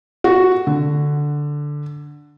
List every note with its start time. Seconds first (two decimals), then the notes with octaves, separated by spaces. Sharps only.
0.24 F#4
0.67 D3